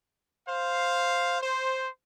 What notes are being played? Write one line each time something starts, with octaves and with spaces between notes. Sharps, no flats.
C5 F5
C5